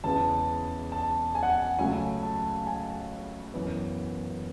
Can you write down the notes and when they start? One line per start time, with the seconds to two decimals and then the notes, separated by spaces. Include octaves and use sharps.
0.04 E2 C#3 G#3 B3 A5
0.92 A5
1.35 G#5
1.43 F#5
1.50 G#5
1.79 C#2 C#3 F#3 A3 G#5
2.23 A5
2.67 G#5
3.54 F#2 E3 B3